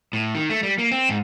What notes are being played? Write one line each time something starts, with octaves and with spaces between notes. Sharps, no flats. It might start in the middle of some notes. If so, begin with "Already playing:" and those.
A2
D#3
A3
G3
A#3
C4
G#2